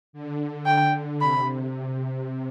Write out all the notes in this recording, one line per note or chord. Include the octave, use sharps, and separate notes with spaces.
D3
G5
C3 B5